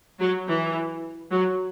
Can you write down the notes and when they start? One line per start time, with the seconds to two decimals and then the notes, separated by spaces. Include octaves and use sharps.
0.20 F#3
0.48 E3
1.32 F#3